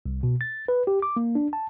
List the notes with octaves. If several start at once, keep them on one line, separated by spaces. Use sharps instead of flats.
C2
B2
A6
B4
G4
D6
A#3
D4
A5